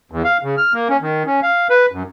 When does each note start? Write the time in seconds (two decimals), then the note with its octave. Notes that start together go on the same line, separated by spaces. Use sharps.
0.12 E2
0.25 F5
0.43 C#3
0.58 F6
0.73 A#3
0.89 C#4
1.01 D#3
1.26 C#4
1.43 F5
1.70 B4
1.92 F#2